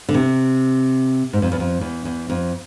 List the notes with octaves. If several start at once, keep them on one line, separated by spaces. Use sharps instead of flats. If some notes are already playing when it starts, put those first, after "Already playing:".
D3
C3
G#2
F2
E2
F2
E2
E2
F2